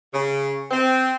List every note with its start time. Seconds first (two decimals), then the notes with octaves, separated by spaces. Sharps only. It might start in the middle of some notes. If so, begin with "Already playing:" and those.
0.14 C#3
0.71 C4